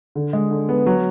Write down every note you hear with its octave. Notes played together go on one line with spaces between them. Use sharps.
D3
G#3
D3
B3
F#3